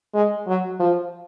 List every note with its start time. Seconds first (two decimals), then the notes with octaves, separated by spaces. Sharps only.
0.14 G#3
0.48 F#3
0.80 F3